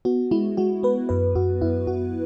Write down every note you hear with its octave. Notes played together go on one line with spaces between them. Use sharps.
B3 F#4
G#3 E4
G#3 F#4
B3 B4
F#2 B4
F#2 F#4
F#2 E4
F#2 F#4